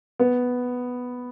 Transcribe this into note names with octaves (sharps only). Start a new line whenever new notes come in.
B3